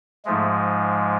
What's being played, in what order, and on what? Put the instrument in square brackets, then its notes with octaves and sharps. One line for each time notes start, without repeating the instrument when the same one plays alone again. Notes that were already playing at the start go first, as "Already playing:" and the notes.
[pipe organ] G#2 F3 G#3 A3